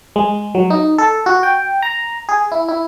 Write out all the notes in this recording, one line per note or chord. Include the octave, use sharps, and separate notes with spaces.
G#3
F#3
D#4
A4
F#4
G5
A#5
G#4
E4
E4